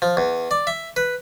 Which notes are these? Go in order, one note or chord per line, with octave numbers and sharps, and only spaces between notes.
F3
E2
D5
E5
B4